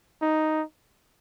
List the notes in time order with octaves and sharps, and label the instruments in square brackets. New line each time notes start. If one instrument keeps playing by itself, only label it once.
[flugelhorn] D#4